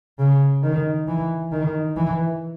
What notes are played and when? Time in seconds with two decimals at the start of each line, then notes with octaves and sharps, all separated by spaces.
0.19 C#3
0.64 D#3
1.08 E3
1.52 D#3
1.97 E3